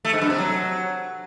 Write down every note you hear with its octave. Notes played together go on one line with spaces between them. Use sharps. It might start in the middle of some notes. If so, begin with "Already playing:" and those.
A3
G#2
G2
C3
F#3